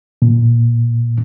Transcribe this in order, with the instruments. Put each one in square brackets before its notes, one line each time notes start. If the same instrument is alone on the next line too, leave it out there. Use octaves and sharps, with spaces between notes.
[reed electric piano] A#2